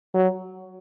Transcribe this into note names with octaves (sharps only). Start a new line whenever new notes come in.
F#3